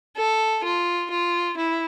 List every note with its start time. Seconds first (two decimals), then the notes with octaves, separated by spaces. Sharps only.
0.17 A4
0.64 F4
1.11 F4
1.57 E4